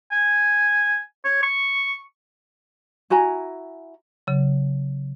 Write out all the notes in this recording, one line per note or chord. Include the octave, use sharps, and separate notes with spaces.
G#5
C#5
C#6
E4 F#4 G#5 A#5
C#3 F#3